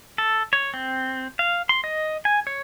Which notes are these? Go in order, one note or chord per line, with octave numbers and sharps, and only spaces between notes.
A4
C#5
C4
F5
C6
D#5
G#5
C#5